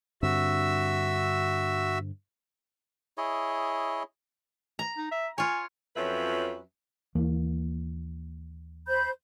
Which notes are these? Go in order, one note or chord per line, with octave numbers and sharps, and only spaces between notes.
G2 D3 C4 F#4 E5 E6
E4 G#4 C#5 D#5
A#5
D#4
E5
F4 C#5 G#5
F2 F3 F#3 C#4 B4 E5
D#2 E3 A#3
C5 B5 G6